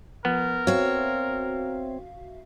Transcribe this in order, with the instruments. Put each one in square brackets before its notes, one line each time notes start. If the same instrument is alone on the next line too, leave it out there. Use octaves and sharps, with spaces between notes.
[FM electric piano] F3 [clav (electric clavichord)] B3 [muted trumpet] A#4
[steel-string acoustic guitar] C4 C#5 [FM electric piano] F#4 E5 F5